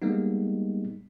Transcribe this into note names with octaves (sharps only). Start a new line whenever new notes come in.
G3 G#3 A#3 B3 D#4